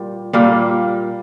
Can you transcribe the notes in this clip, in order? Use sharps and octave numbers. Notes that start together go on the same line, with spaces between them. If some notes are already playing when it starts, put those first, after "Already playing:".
Already playing: A#2 G3
A#2 G3 A#3